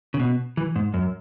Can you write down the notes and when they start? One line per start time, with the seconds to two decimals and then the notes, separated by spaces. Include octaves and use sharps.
0.14 C#3
0.20 B2
0.57 E3
0.76 G#2
0.94 F#2